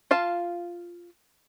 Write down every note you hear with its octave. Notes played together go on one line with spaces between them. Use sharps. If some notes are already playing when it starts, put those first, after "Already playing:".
F4 F5 A5